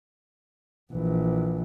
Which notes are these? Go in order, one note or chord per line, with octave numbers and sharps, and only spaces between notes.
A#1 E3